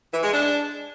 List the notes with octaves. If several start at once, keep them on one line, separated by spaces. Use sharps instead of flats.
E3
G#3
D4